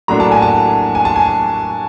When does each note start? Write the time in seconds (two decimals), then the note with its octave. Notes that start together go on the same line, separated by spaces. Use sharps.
0.08 A2 F#3 A#3 D4 A#5
0.20 A5
0.32 G#5
0.42 A5
0.95 G#5
1.05 A5
1.16 G#5